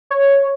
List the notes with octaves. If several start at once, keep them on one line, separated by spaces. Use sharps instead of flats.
C#5